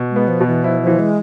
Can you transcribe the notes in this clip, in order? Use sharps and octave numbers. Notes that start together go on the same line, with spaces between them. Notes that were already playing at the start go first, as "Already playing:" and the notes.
Already playing: B2
G#3
B3
F3
B2
E3
F3 E4
F3
E3
G#3